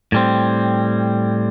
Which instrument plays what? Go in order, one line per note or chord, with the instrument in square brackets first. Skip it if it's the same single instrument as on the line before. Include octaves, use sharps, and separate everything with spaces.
[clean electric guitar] A2 G3 C4